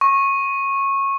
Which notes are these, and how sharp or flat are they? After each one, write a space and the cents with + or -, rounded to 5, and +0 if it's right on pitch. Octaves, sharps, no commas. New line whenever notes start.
C#6 -20